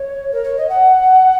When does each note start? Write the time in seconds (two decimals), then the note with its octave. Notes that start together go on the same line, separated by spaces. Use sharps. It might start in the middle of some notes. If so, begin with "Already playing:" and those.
Already playing: C#5
0.31 A#4
0.43 C#5
0.56 D#5
0.69 F#5